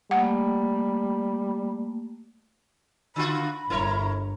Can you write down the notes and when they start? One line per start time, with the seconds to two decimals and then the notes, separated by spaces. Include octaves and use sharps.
0.11 G3 A3 A#3 F#5
3.16 D3 F4 F#4 B5
3.70 G1 E4 A#4 C#5